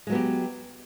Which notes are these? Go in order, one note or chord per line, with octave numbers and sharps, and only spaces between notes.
F#3 G#3 B3 G4